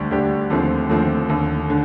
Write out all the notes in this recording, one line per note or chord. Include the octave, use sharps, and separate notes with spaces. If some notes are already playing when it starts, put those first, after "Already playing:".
Already playing: D2 D3 G3 D4 G4
D2 D3 G3 D4 G4
D#2 D3 F3 A3 C4
D#2 D3 F3 A3 C4
D#2 D3 A3
D3